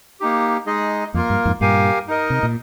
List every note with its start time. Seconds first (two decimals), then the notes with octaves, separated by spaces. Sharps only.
0.20 A#3 D#4 G4
0.66 G#3 D#4 G#4 D#5
1.14 F2 A#3 F4 A#4
1.30 G2
1.46 F2 G#2
1.61 G2 A#2 G4 A#4 F5 G#5
2.08 D#4 A#4 D#5
2.30 C3
2.43 A#2